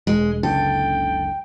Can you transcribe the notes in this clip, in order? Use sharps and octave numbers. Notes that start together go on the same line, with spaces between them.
E1 G#3
F#1 C#2 D3 A4 G5